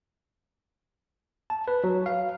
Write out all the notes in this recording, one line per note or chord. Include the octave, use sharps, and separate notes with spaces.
A5
B4
F#3
F5